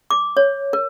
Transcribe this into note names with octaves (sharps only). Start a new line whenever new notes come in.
D6
C#5
A#4